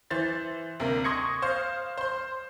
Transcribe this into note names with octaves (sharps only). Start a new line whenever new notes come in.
E3 C5 A6
D2 C3 A#3
C6 C#6 D#6 G#6 A#6 C#7
C5 F5 F6
C5 C6